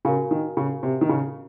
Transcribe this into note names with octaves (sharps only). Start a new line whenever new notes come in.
C#3 F#4 A#4 F5 G#5
D#3
C#3
C3
D#3
C#3